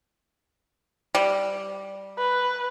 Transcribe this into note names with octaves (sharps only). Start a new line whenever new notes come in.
G3
B4